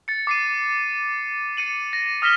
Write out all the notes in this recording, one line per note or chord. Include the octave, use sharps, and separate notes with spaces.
A6 C#7
D6 C7 D#7
A6 C#7 D#7 F#7
A#6
D#6 F6 A#6 B6 E7 G7